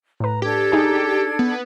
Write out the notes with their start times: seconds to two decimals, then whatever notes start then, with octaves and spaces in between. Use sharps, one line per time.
0.20 A2 B4 A#5
0.42 D4 G4 A4 G#6
0.72 D#4 G#4
1.39 B3